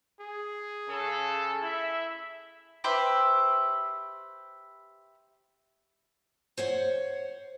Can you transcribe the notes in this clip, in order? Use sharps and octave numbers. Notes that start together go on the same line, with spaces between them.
G#4
C#3 A4
E4 E5
G4 B4 C5 E5
C5 C#5 F#5